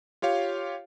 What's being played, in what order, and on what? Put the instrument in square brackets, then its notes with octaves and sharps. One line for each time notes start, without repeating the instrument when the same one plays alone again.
[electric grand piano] F4 G4 C#5 F5